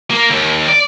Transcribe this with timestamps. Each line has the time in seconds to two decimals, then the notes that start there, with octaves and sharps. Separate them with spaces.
0.11 A#3
0.30 D#2
0.68 D5